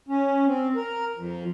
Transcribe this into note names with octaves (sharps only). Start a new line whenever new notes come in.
C#4
C4
A#4
F2